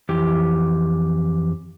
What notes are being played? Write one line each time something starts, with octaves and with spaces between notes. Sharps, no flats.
F2 E3 G4